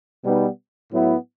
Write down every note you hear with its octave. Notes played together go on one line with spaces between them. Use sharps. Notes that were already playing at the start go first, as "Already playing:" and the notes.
B2 G3 B3 D#4
A2 F#3 B3 E4